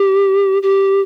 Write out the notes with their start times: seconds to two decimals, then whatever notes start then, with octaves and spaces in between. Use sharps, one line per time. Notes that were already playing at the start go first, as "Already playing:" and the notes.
Already playing: G4
0.62 G4